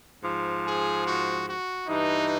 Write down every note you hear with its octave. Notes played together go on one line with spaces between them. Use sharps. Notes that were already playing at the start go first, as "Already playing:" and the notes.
G#2 F3
G#4
F#4
F#4
G2 E3 D#4